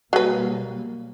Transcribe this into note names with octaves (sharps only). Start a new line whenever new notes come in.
B2 F#3 G3 A#3 B4